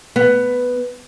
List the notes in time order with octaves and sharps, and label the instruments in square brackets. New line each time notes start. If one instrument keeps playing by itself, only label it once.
[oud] B3